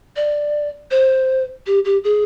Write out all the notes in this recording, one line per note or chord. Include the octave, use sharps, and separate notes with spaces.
D5
C5
G4
G4
G#4